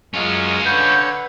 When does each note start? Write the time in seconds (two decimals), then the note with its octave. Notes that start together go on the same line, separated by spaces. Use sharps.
0.14 F#2 G#3 C#4 F4
0.66 D3 B4 C#5 F#5 G6 G#6